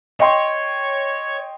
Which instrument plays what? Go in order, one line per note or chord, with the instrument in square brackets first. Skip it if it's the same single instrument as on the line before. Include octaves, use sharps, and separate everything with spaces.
[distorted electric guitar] C#5 [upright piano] D#5 G5 C6